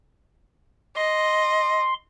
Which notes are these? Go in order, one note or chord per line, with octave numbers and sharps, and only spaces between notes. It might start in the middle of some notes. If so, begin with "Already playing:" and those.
D#5 C6